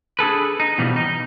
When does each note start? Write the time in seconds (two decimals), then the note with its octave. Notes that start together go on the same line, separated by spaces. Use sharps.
0.19 D4 G#4 A4 B4
0.60 D#4
0.78 B2 E3 F3 G3
0.96 D#4